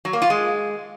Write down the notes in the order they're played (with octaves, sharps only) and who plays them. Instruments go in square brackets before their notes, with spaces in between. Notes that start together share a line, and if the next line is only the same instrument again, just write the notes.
[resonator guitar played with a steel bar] F#3
A#3
F4
G#3